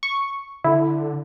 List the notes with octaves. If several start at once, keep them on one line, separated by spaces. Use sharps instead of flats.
C#6
D3 E4